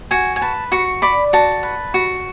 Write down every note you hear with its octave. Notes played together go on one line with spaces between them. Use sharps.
F#4 G#5
G#5
B4 A5
F#4 C#6
D5 B5
F#4 A5
B4
F#4